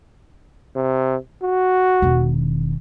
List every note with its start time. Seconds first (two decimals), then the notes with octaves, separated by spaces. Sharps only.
0.76 C3
1.43 F#4
2.02 E1 D#3